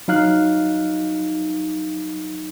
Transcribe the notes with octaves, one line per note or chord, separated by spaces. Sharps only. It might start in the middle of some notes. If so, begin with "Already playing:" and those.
F#3 D#4 F5 F6 F#6